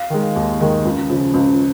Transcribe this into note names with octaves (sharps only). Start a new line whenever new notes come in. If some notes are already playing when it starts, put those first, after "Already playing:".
Already playing: F5
D#3 G#3
D#2
D#3 G#3
C#2
C#3 F3
C#2